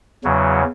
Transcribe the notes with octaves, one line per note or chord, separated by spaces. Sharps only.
E2 C#3 F#3